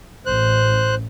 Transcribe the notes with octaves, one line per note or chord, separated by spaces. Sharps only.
A1 C5 F#6